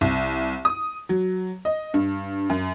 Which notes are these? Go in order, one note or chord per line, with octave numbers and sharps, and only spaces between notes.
C2
D#6
F#3
D#5
G2
F#2